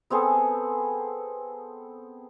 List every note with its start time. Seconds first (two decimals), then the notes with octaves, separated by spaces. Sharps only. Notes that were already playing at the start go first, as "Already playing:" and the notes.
0.10 B3 C4 G#4 A4